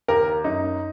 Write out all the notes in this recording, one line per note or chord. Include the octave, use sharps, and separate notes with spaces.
D#2 A#4
F#2 D#4